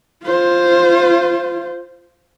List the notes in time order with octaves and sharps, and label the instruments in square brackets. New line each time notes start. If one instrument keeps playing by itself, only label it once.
[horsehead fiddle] F4 C5